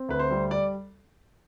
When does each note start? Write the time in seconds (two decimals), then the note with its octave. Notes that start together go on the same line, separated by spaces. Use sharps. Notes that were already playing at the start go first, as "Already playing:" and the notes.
Already playing: C4
0.09 D2 B4
0.19 C5
0.31 G3
0.51 D5